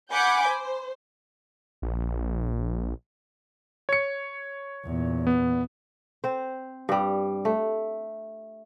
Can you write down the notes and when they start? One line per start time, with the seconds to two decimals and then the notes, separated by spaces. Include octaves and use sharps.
0.11 F#5 G#5 B5 D6 G6
0.50 C5
1.82 A#1
3.89 C#5 C#7
4.86 E2 A#2
5.27 B3
6.24 C4 C5
6.89 G2 G3
7.45 A3